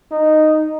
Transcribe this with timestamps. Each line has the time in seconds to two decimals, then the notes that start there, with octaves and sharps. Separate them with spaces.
0.11 D#4